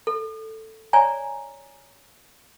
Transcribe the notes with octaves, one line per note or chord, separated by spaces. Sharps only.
A4
C#5 D5 G#5 A#5